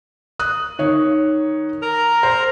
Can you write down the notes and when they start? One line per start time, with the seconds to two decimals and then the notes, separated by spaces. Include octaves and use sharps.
0.39 D#6 F#6
0.79 D#3 C#5
1.82 A#4 A#5
2.23 C5